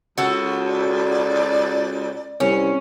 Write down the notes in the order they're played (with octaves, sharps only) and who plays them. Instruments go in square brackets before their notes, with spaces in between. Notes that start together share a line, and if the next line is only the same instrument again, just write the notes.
[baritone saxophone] C#2 [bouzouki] F#4 A4
[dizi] D5
[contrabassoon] C2 [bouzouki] C#4